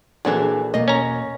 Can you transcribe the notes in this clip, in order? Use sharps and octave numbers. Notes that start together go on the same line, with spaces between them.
A#1 E3 D4 F#4 G#4 A4
E2 B2 A#3 D#5
C#4 A#5